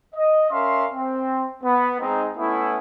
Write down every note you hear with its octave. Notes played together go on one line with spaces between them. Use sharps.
D#5
C#4 A#4 E5 F5 C6
C4
B3
G#3 C4 D#4
A3 B3 C#4 E4